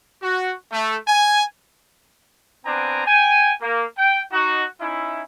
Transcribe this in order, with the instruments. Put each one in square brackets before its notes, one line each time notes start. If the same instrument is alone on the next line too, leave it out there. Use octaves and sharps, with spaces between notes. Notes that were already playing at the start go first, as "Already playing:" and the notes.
[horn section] F#4
A3
G#5
[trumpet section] B3 C4 D4 G#5 A#5
G5 G#5
A#3
G5
D#4 F#4
C#4 D#4 E4